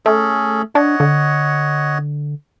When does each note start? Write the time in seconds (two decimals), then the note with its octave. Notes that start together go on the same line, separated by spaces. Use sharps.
0.06 A3 C#4 G#4 A4
0.75 D4 C#5 D#5 F#5
1.00 D3